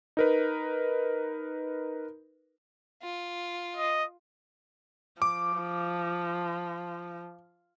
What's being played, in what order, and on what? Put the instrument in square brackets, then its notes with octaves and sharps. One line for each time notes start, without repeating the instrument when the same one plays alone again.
[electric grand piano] D#4 A#4 B4
[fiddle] F4
[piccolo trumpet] D#5
[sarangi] F3 [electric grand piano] D6